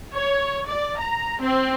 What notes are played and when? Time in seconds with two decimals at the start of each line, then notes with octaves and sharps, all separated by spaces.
0.13 C#5
0.65 D5
0.98 A#5
1.40 C4